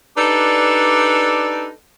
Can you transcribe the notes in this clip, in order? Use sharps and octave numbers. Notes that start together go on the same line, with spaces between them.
D4 D#4 G4 A4 B4 D5